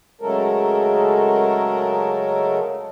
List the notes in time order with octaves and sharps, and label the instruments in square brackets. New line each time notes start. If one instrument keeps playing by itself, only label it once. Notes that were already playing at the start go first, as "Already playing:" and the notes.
[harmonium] C#3 F#3 G#3 A3 A4 A#4